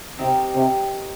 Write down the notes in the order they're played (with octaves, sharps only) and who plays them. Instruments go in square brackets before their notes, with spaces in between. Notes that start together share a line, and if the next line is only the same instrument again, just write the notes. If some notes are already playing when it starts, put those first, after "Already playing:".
[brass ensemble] C3 [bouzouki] C4 D#4 G4 A#4
[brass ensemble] C3